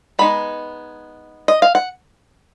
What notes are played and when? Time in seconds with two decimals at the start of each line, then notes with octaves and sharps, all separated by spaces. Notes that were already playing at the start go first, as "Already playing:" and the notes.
0.19 G#3 B3 D#4 B5
1.48 D#5
1.62 F5
1.75 F#5